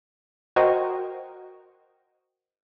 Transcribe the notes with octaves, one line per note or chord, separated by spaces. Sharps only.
F#4 A#4 C5 D#5 G5